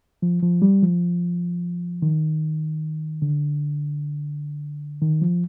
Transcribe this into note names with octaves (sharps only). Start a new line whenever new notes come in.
F3
F3
G3
F3
D#3
D3
D#3
F3